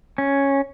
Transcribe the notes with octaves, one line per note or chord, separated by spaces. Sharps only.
C#4